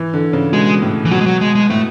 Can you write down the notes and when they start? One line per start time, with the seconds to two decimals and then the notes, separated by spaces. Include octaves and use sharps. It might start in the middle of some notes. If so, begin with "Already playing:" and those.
Already playing: E3
0.14 D3
0.33 C#3
0.52 B2 G#3
0.82 A2
1.05 E3
1.11 B2 F#3
1.21 G#3
1.26 F#3
1.41 G#3
1.55 G#3
1.70 A2 A3